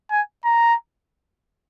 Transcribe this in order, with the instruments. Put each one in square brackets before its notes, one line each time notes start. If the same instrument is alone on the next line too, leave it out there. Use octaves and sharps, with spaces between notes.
[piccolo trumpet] G#5
A#5